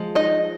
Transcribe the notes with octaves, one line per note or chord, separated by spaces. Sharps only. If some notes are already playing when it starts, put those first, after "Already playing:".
Already playing: F3 G#3
D#4 D#5